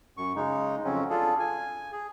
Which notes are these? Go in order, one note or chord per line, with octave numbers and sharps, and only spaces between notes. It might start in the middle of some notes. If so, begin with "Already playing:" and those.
F#2 C#6
C#3 G#3 D#4
F2 C#3 F#3 C4 C#4
D4 F4 G#4 A4
G#5
G#4